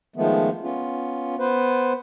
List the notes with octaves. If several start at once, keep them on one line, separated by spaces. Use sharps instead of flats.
D#3 F3 G#3 A3 B3
B3 C#4 F4
B3 B4 C5